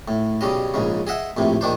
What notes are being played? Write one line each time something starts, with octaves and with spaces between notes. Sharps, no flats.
A2
B1 C#3 G3 D#5
A#1 G#2 C#3
G#4 D#5 E5 F#5
A#1 A2 C3
A#1 D#3 D4 C5